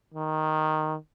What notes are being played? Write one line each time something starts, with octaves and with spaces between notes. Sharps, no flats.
D#3